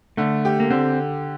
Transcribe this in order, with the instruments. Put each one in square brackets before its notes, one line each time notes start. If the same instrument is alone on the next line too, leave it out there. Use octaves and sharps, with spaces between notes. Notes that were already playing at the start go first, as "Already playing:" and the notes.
[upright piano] D3 [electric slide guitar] A3
[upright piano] G4
[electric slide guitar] A#3
[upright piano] D3 [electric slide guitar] C4